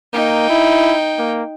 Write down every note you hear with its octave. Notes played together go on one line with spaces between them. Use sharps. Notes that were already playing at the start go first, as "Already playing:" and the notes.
A#3 D#4 G5
E4
A#3